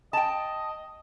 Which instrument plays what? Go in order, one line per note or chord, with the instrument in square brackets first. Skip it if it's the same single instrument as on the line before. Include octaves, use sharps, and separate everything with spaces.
[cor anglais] D#5 [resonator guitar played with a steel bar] G5 A5